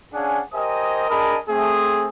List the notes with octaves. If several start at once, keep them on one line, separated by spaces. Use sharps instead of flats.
C#4 D4 G#4 F5 F#5 G#5
G4 A#4 C5 D#5 G#5 D#6
D4 G#4 A#4 D#5 A5 B5
A3 C4 G#4